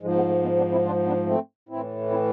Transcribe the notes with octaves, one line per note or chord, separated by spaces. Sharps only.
G#2 F3 G#3
G#3 B3
A3
G#3 B3
B3 D4
C4 E4
D4 F4
B3 D4
A3 C4
A2 E3 C4 E4
C4 E4